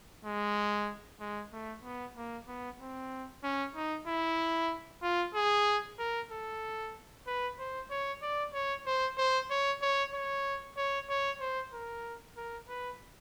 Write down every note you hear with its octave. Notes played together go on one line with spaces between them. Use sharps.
G#3
G#3
A3
B3
A#3
B3
C4
C#4
D#4
E4
F4
G#4
A#4
A4
B4
C5
C#5
D5
C#5
C5
C5
C#5
C#5
C#5
C#5
C#5
C5
A#4
A#4
B4